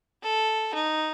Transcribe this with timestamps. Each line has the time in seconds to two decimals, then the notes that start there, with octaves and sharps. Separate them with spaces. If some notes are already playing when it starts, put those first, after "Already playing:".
0.22 A4
0.74 D#4